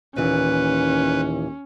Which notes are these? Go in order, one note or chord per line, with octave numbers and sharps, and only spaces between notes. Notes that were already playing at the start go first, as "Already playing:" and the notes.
D#2 A#2 E3 C#4 B4